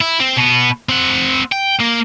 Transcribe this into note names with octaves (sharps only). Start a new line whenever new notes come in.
E4
C4
B2 B3
C4 F#5
G5
A#3